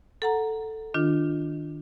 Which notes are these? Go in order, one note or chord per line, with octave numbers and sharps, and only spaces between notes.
A4 F#5 A#5
D#3 D4 F4